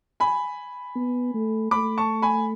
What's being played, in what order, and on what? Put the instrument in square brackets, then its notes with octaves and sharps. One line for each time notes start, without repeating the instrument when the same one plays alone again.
[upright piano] G#5 B5
[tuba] B3
A3
[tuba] A3 [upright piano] B5 D6
[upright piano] A5 C#6
G#5 B5